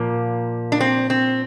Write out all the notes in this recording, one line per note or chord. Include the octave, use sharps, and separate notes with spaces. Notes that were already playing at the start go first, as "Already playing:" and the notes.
Already playing: A#2 F3 A#3
D4
C4
C4